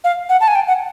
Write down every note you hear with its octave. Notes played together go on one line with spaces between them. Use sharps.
F5
F#5
A5
G#5
G5
F#5